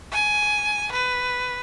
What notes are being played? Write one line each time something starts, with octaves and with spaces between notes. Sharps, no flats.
G#5
B4